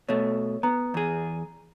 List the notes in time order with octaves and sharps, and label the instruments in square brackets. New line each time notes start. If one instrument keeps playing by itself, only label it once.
[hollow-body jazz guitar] B2 A3 [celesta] C#5
[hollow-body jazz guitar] B3 [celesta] A#5
[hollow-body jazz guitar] E2 G#4